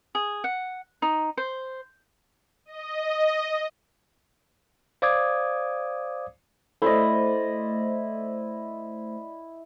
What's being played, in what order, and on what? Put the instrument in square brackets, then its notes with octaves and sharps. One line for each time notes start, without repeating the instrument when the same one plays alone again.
[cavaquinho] G#4
F#5
D#4
C5
[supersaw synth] D#5
[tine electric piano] C5 D5 F5 D6 D#6 G#6
[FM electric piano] A3 C5 [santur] E4 D5 D#5